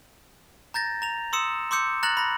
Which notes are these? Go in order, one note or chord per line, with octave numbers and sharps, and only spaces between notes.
A#5 G6 A6 A#6
A#5 F7
C6 D#6 E6 C#7 E7
C6 D6 E6 G6 C#7
A#5 F#6 A6 A#6 F#7
B5 A#6